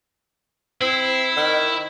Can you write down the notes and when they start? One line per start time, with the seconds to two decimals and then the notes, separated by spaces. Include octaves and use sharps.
0.81 C4 E4
1.37 D#3